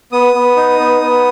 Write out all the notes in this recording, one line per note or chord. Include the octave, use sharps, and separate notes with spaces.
B3 D#6
B3
D#4
B3
B3